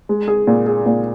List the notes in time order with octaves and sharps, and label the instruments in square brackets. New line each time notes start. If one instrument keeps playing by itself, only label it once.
[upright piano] G#3
G#4
A#2
G#4
A#2